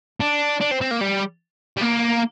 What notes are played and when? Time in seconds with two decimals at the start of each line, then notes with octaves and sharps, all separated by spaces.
0.20 D4
0.61 D4
0.71 C4
0.81 C4
0.91 A#3
1.01 G3
1.77 G3
1.81 A#3